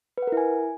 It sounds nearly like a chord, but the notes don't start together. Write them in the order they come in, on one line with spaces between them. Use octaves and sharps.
B4 F#5 A#4 E4 G#5